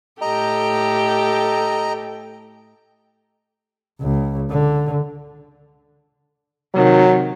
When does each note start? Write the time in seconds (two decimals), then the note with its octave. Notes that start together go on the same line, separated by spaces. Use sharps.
0.22 A2 G4 A4 D#5 G5 A#5
4.01 C#2
4.50 D3
6.74 C3 D#3 F#3